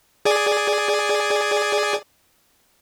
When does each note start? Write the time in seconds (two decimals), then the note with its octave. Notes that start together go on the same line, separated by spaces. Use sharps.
0.25 G#4 D5 G#5